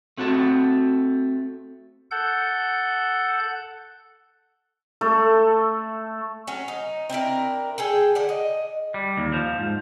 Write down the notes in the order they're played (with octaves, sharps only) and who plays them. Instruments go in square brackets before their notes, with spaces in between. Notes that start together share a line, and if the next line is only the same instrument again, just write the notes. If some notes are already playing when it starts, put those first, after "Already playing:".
[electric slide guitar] A3 C4 F#4 A4 A5
[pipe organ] A4 F#5 G6
[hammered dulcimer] A3 A4
[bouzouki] F#3 C#4
D#4
C4 D4 E4 A#4
G#4 A4 G5
D3 D5 F#5
D#5
[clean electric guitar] G3
D#2
F3
G#2